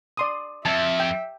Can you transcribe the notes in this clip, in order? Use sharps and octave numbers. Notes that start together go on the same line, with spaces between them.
D5 C6 D#6
F2 E5 A5
G5